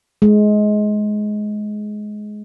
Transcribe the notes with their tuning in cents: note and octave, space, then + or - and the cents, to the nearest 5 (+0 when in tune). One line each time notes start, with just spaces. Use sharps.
G#3 +20